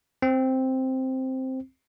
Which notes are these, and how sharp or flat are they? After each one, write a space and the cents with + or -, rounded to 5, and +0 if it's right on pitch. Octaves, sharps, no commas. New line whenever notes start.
C4 +0